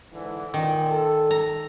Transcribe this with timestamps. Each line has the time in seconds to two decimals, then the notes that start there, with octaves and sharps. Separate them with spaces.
0.13 G#2 D3 E3
0.54 A#2 D#3
0.90 A4
1.31 A#5